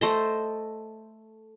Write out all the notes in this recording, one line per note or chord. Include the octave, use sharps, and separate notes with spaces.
A3 C5 D#5